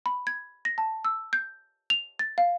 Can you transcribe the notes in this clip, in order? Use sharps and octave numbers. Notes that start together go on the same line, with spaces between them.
B5
G#6
A#6
A5
E6
G6
F7
A6
F5